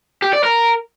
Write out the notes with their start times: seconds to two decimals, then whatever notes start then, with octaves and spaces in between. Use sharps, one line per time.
0.22 G4
0.33 D5
0.44 A#4